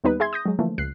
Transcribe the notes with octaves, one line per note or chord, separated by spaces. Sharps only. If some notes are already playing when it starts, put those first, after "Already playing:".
D#2 G3 B3 D#4 B4
G#4 E5 C6 G#6
D#6 G6 A#6
F#3 G#3
D3 E3 F3 A3 A#3
C#2 F#6 C7